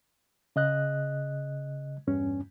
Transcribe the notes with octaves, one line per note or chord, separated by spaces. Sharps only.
C#3 D#5 F#6
E2 G2 C#4